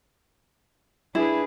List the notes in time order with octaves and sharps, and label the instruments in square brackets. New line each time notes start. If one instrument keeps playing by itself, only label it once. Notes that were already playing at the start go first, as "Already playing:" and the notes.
[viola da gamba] D4 G#4 B4 [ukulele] E4